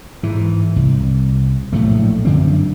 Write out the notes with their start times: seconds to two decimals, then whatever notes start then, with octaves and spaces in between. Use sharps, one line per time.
0.23 G#2 E3
0.76 C2
1.73 A#1 A2 F#3 A3
2.25 F#2 D3 C4